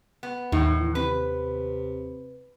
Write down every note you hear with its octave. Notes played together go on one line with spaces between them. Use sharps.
B3
D#2 A2 D#3
E3
C3 B4